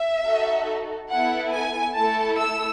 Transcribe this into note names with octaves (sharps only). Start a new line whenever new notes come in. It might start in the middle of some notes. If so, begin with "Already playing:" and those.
Already playing: E5
D#4 F#4 A4
B3 E4 A4 F#5
G#5
A3 E4 A4 A5
E6